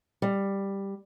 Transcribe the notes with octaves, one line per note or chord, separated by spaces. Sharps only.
G3